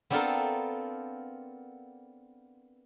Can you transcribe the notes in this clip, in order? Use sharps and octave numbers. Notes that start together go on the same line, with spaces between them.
B3 C4 D4 F4 A4 A#4